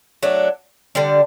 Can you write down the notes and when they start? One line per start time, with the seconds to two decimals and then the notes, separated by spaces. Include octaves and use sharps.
0.23 F#3 A3 D4
0.95 D3 G3 D4